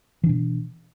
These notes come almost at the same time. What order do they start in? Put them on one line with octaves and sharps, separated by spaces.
E3 D4 B2